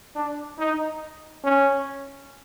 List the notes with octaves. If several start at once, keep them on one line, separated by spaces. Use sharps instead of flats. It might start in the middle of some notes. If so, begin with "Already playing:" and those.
D4
D#4
C#4